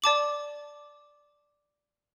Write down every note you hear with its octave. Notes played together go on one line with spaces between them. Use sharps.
D5 A5 D6 F#7